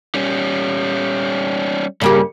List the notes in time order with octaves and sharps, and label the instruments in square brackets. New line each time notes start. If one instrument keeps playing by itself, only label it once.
[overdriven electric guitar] G3 C#4
[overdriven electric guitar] G2 [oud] C#3 A#3 G4